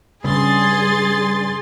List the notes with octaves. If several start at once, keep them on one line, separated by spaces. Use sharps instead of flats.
G2 C#3 G#4 C6 A6